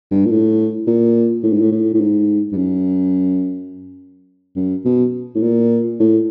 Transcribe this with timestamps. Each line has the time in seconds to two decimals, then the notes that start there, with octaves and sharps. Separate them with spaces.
0.11 G2
0.26 A#2
0.30 A2
0.87 A#2
1.43 A2
1.53 G#2
1.61 A2
1.72 A2
1.94 A2
2.00 G#2
2.52 G2
2.57 F#2
4.56 F#2
4.85 B2
5.35 A2
5.42 A#2
6.00 A2